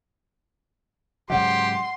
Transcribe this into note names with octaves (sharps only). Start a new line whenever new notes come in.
G#2 C#3 F#3 G4 F#5 C6